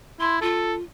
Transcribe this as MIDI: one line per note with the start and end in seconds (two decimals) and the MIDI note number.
0.20 0.38 64
0.20 0.37 84
0.42 0.82 65
0.42 0.74 69